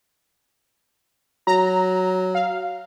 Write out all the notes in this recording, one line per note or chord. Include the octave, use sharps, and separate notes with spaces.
F#3 A#5
F5